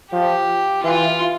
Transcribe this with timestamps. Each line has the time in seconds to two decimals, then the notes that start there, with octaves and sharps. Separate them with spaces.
0.12 F3 G4
0.83 E3 F4